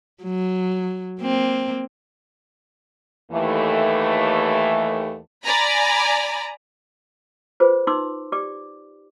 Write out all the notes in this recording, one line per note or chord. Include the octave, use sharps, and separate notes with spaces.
F#3
A#3 C4
D#2 E3 A3
D5 G#5 A#5 B5
F4 G#4 B4 C5
D#4 C6 D6 E6
G4 D5 D6